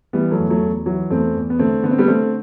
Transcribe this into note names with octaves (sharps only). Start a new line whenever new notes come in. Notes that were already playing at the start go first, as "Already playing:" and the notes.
E3 G3 B3
F#3 A3
E2
F#3 A3
E2
E3 F#3
E2 A3 C4
E2
B3
D3 A3 C4
D3 B3
C4
G3 B3
D3 A3 C4